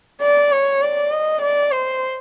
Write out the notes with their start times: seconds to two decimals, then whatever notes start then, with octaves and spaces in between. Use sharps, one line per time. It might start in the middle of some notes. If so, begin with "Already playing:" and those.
0.22 D5
0.52 C#5
0.82 D5
1.12 D#5
1.42 D5
1.72 C5